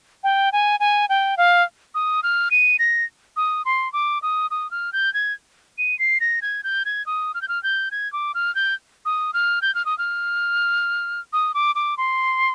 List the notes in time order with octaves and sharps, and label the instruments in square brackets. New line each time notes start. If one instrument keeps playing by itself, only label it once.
[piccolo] G5
G#5
G#5
G5
F5
D#6
F6
D#7
A#6
D#6
C6
D6
D#6
D#6
F6
G6
G#6
D#7
C7
A#6
G#6
G6
G#6
D#6
F6
G6
F6
G6
G#6
D6
F6
G6
D#6
F6
G6
F6
D#6
F6
D#6
D6
D6
C6